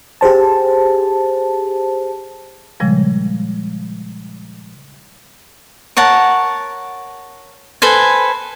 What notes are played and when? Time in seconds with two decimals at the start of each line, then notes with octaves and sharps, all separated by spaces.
0.21 G4 G#4 C5 A5
2.80 A#2 C#3 F3 G3 G#3
5.97 A#4 C#5 F#5 A5
7.82 A4 B4 C5 G#5